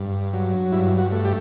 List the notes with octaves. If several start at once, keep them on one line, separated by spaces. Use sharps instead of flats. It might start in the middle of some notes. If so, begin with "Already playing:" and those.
Already playing: G2
F#3
G2 E4
F#4
A3
G4